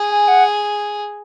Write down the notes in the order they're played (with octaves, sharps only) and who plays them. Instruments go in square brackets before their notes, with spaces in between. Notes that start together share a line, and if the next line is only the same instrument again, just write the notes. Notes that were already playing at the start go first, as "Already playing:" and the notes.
Already playing: [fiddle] G#4
[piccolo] G#5
F#5